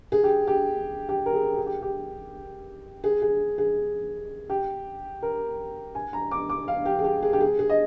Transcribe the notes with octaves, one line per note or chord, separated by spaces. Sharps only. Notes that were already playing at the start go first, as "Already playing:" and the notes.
G#4
G4
G4
G4
A#4
G#4
G#4
G4
G4
G#4
G#4
G#4
G4
A#4
G#5
A#5
D6
D6
F5
G4
G#4
G4
G#4
G4
G#4
G#4
D#5